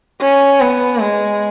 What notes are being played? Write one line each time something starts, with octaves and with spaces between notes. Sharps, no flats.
C#4
B3
G#3